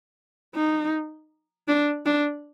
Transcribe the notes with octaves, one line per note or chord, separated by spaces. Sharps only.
D#4
D4
D4